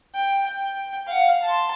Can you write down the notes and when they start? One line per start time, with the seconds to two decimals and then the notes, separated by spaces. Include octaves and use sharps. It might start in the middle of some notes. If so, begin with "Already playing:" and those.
0.15 G5
0.46 G5
1.07 F5 F#5
1.43 A5 C6